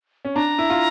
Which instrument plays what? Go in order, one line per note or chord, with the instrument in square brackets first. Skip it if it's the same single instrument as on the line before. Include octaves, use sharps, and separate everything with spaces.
[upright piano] C#4
[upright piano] D4 [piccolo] A#5
[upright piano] E4
F4